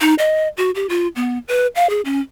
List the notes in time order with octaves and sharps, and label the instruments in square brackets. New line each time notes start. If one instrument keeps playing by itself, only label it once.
[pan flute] D#4
D#5
F#4
G4
F4
B3
B4
F5
G#4
C#4